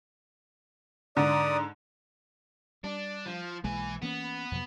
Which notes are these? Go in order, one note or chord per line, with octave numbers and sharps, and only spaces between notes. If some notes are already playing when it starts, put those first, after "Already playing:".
G#2 D3 D5 D#6
G3 D4
F3
B1 E3 G#3 A#3 G#5
E3 A#3 B3 C#4
F2 C3 F#3